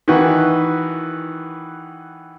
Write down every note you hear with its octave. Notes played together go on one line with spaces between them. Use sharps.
D#3 E3 F#4 B4